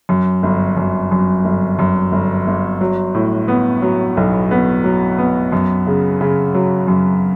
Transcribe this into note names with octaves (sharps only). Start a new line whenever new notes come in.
F#2
G1
F#2
F#2
G1
F#2
G1
G1
F#3
A2
B3
F#3
B1
B3
F#3
B3
F#2
C#3
C#3
F#3
F#2